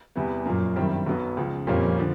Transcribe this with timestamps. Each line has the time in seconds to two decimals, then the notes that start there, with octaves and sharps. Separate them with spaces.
0.16 E2 C3 E3 G3 B3
0.45 F#2 A#2 F3 A#3
0.76 G2 D#3 G3 C4 E4
1.06 B1 B2 F#3 B3
1.37 C#2 C#3 F3
1.67 F2 A#2 G3 A#3 C#4
1.98 D3 F3